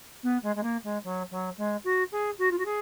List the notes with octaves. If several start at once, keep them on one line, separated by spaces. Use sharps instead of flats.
B3
G#3
G#3
A#3
G#3
F#3
F#3
G#3
F#4
G#4
F#4
F4
F#4
G#4